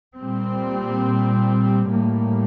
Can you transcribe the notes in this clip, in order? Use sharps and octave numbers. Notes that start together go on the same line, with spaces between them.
A#2 G3 C4
A2 G3 A#3